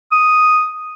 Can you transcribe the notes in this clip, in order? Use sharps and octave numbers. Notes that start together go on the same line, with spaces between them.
D#6